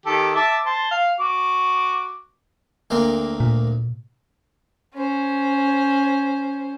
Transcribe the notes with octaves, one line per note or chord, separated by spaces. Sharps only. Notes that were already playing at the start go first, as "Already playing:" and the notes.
D#3 G4 A4
E5 A5 D6
C5 A5
F5
F#4 D6
D2 A#3 C4
A#2
C#4 C5